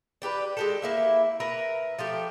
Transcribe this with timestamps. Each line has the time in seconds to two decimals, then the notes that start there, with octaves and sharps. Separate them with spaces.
0.22 D4 G4 A4 B4
0.57 G#3 G4 A4
0.82 A#3 E4 E5
1.40 A#4 B4 E5 A#5
1.99 F3 A3 G4